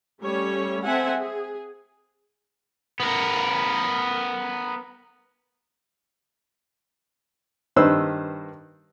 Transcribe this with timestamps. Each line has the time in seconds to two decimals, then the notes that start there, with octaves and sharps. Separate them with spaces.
0.22 G3 A3 C#4 C#5
0.85 C4 A4 E5 F#5 G#5
1.19 G#4
3.00 B3 A#4
7.76 G2 D#3 B4 C5 E6